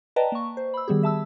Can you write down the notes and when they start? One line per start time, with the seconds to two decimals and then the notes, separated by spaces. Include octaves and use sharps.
0.16 B4 D5 D#5 G5 A5 A#5
0.32 A#3 C#6
0.57 C5
0.74 B5 E6
0.88 D#3 G3 B3 G4 G#4
1.03 E5 A5 E6